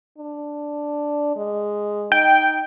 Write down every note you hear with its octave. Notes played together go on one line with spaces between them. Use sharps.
D4
G#3
D#4 G5